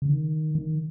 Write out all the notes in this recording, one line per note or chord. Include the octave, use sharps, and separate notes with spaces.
C#3
D#3
D#3